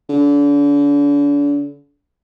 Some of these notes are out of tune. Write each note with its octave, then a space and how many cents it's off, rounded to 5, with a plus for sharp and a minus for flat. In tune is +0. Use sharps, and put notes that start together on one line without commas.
D3 -40